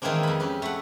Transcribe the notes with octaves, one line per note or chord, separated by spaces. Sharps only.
D#3 E3 G#3 A#3 C4 D4
F2 B5
C#4 G4 B4
A3 F#5